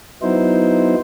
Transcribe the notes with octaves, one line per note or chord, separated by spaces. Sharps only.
F#3 B3 D#4 E4 C5